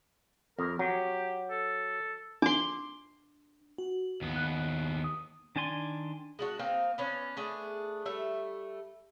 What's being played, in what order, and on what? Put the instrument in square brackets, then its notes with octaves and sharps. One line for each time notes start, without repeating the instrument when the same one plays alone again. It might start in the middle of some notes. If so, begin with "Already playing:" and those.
[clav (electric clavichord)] F2 [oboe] A#4
[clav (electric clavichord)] F#3 [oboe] G4
[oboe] A4
[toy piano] D4 [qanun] C6 D6
[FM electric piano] F#4
[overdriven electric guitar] D#2 B3
[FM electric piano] F#6
D#6
[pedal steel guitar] D#3 D4 D5 G#5 C6
[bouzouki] G#3 D4 F#4
A#3 C4 D#4 C5
B3 C#4 D4
A3 B3 D4 G#4
G3 A3 E5